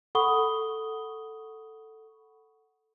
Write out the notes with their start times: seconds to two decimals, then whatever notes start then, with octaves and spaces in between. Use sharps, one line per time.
0.15 A4 F#5 B5 C#6 D#6 G7